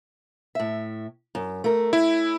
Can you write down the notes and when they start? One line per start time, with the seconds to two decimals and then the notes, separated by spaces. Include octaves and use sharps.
0.55 A2 E5
1.35 F#2
1.64 A3 A#4
1.93 C#4 E4